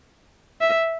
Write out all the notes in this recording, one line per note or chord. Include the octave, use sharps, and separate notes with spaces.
E5